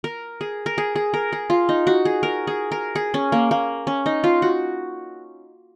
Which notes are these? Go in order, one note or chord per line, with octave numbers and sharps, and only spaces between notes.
A#4
G#4
A#4
G#4
G#4
A#4
G#4
F4
D#4
F#4
G#4
A#4
G#4
A#4
G#4
C#4
A#3
A#3
C#4
D#4
F4
F#4